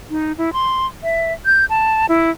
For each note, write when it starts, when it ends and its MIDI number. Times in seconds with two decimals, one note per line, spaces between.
0.10 0.33 63
0.38 0.53 64
0.53 0.86 84
1.03 1.33 76
1.46 1.65 91
1.70 2.06 81
2.09 2.31 64